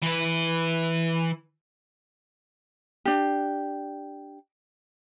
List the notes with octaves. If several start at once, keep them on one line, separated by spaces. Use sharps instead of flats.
E3 B4
D4 G4